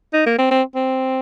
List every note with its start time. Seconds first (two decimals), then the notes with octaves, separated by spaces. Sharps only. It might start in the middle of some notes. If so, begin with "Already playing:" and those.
0.13 D#4
0.26 A#3
0.38 C4
0.51 C4
0.75 C4